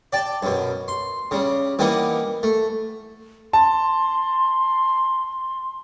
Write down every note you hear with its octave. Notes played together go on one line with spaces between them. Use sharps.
D5 G5 A5
F#2 B2
C6
C#3 G3
E3 G3 A#3 B3 D#4
A3
A5 C6